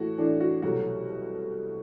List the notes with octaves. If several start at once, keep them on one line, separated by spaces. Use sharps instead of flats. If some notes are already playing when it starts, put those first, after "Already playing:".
Already playing: A2 E3 A3 F#4
A2 E3 A3 D4
F#4
C2 B2 F#3 A3 F#4